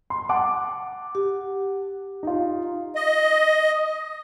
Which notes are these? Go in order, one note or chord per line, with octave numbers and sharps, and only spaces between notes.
C6
F#5 A5 D6
G4
D#4 F4
D#5